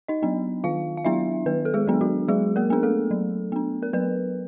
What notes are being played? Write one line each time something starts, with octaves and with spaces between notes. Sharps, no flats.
D#4 D#5
F#3 B3 D4
D#3 F4 F5
F5
F#3 B3 D4 E4 E5
D#3 B3 B4
A4
G#3 G#4
F#3 B3 D4
F#3 F#4
F#3 G#3 G#4
A#3 A#4
B3 D4 G#4
A3 A4
F#3
B3 D4
A#4
F#3 B3 B4